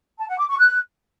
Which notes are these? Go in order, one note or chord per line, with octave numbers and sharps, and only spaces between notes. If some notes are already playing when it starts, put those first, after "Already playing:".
A5
F#5
D6
C#6
F#6